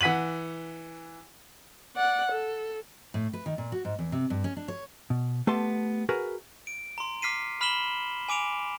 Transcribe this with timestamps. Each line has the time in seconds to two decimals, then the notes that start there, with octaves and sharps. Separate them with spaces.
0.01 E3 F#5 B6 D#7 F#7
1.96 D5 F#5
2.31 A4
3.14 A2
3.33 B4
3.46 D#3
3.58 A#2
3.72 F#4
3.85 G#2
3.99 E2
4.12 C3
4.30 G2
4.44 C#4
4.57 D4
4.68 C#5
5.10 B2
5.47 A3 B3 G4 A5 C6
6.09 F#4 G#4 A#4 B4
6.67 D7
6.98 A#5 C6
7.22 D6 F6 B6 C7 D#7
7.61 B5 F6 B6 E7 F#7 G7
8.29 G#5 D6 D7 F7